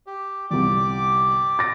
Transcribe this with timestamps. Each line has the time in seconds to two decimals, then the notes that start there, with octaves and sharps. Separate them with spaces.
0.07 G4
0.50 G1 C2 G4 D5 D6
1.59 A6 A#6 D7